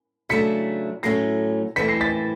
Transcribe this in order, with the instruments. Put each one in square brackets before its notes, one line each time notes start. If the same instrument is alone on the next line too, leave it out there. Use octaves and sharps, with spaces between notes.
[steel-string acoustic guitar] C#3 F#3 A3 D4 [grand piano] B6 C#7
[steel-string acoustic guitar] A2 F#3 A3 C#4 [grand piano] A#6 C7
[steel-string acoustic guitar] E3 A3 C4 [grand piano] B6 C#7
[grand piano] A#6 C7
A6 B6